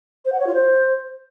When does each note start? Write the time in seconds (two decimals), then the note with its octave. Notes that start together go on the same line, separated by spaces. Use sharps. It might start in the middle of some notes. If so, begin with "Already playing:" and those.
0.25 C5
0.32 F#5
0.39 C#5
0.47 F4
0.54 C5